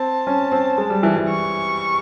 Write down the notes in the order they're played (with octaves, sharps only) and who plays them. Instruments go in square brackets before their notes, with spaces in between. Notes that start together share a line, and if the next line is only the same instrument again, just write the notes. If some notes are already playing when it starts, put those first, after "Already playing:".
Already playing: [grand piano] C4 [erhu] A5
[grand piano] C#4
C4
G#3
G3
E3
E3
[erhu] C#6